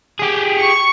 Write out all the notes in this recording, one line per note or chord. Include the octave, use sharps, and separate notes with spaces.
G4 G#4
C#6